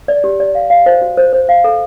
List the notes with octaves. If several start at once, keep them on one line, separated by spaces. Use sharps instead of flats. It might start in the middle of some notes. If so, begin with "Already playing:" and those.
D5
G4
D5
F5
F5
C5
F#4
C5
C5
F5
A4